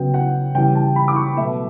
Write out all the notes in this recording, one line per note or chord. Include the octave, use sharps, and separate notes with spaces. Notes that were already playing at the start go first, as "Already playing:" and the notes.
Already playing: C#3 F#3 B3 G5
F#5
C#3 E3 G3 G5
A5
B5
D6
C#6
B2 F#3 A3 E5